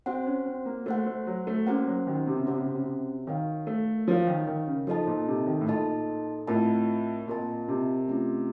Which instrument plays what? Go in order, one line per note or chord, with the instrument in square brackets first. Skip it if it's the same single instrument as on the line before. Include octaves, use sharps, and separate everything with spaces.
[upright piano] C4 [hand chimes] F#4 C5 F#5
[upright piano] C#4
C4
A#3
[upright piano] A3 [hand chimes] F#4 C5 F#5
[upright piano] A3
F#3
A3
[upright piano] A#3 [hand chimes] C#4 F#4 C5 F#5
[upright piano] F#3
D#3
C3
C#3
[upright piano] C3 [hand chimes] C#4 F#4 C5 F#5
[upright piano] C#3
C3
C#3
C3
[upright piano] D#3 [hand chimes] F#4 A#4 C#5 F5
[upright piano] A3
[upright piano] F3 [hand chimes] F#4 A#4 C#5 F5
[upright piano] D#3
D#3
C#3
[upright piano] F3 [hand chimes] D#4 A4 D#5 A5
[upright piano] A#2
C3
D#3
A2
[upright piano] A#2 [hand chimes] D#4 A4 D#5 A5
[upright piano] A2 [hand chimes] C4 F4 A#4 D#5 A5
[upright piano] A#2 [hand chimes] C4 F4 A#4 D#5 A5
[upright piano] C3
[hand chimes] A3 C#4 F4